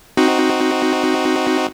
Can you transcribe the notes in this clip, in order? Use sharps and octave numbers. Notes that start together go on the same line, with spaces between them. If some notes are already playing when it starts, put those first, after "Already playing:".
C4 D#4 F#4